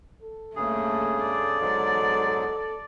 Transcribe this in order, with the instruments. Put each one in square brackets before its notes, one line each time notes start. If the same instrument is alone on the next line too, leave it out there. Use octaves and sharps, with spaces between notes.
[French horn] A4
[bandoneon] G2 C#3 G#4 [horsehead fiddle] A3 A#3
[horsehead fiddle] D5
[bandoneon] G#2 F#3 G#3
[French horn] A4